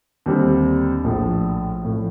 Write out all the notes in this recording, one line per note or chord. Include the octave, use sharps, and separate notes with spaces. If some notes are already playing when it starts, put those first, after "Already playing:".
D#2 D3 G3 C4
A#1 A2 F3
A2 F3